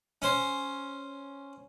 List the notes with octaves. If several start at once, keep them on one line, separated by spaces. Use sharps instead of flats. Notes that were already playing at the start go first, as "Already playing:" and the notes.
C#4 C5